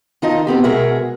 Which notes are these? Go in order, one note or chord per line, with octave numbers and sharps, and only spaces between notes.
D#3 D#4 F4 D#5 A5
B3 C4 G4
B2 G#3 F#4 G#4 A#4 E5